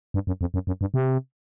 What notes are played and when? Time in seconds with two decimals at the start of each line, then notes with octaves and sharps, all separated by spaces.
0.14 G2
0.27 F#2
0.41 F2
0.54 F#2
0.67 F#2
0.81 G2
0.94 C3